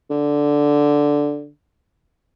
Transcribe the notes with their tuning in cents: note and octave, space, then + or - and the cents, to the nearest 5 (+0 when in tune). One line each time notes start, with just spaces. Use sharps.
D3 -5